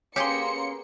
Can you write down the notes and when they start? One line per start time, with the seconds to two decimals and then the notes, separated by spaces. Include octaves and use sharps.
0.16 A#3 B3 C#4 G4 G#4 C6 C#7